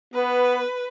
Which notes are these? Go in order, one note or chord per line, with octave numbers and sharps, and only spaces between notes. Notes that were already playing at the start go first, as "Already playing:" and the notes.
B3 B4